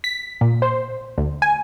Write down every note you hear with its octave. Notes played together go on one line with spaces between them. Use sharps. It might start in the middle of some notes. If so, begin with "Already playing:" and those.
B6
A#2
C5
D2
G#5